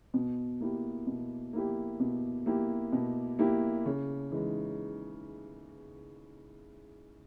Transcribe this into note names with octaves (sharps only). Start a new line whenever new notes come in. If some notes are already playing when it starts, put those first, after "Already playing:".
B2
A#3 E4 G4
B2
A#3 E4 G4
B2
A#3 E4 G4
B2
A#3 E4 G4
C#3
E3 G#3 D#4